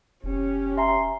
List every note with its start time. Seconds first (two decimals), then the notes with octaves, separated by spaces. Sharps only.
0.24 F1 C#4 G4
0.78 E5 G#5 A#5 C6